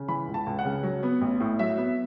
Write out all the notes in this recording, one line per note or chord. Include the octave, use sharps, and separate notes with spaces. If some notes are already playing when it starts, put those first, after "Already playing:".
Already playing: C#3
E3 B5
C#2
A5
C#2
F#5
C#3
F#3
B3
A1
A2
F#3 E5
B3